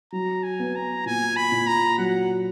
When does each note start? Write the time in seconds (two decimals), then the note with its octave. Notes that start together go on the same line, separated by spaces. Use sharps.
0.12 F#3 A#5
0.43 G#5
0.60 B3
0.75 A#5
1.06 A#2 G#5
1.36 B5
1.52 A#2
1.67 A#5
1.98 F#3 F#5